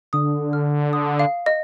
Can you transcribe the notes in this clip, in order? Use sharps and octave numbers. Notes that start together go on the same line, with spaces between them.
D3 D#6
F6
D#6
F5
D#5